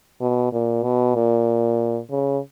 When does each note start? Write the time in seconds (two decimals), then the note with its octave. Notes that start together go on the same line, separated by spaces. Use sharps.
0.21 B2
0.52 A#2
0.83 B2
1.15 A#2
2.10 C#3